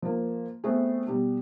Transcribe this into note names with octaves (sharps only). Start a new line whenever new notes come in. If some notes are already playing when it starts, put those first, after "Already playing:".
F3 A#3
A3 B3 C4 F#4 G#4
B2 G3